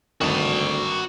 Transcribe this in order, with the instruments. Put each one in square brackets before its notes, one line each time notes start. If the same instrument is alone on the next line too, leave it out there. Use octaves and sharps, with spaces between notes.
[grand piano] G#1 G2 D#3 [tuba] D2 [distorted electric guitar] F#4 A5